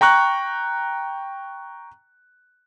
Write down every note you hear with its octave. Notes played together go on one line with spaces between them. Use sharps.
G5 A#5 C#6 F#6